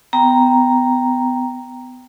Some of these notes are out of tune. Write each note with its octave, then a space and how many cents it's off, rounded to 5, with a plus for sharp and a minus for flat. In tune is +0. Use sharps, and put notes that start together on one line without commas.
B3 +25 G5 +0 A#5 +0